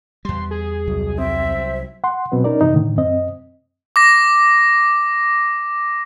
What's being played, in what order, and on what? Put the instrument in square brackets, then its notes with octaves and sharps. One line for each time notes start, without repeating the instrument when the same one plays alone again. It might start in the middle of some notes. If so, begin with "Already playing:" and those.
[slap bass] E2 G3 [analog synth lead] C6
[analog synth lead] G#4
[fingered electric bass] C2 F#3
[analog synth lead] C4 [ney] E5
[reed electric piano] F#5 C6
B2 F#3 C4 B4
C#4 D#4 A#4 D5
F#2 C3 E3 D#4
A2 D3 D#3
F#2 C4 D#5
[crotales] D6 A#6